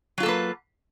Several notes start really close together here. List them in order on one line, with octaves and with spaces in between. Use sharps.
F#3 F4 A4 A#3 B4